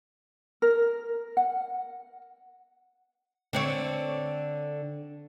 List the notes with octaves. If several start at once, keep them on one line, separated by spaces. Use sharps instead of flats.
A#4
F#5
D3 C4 C#5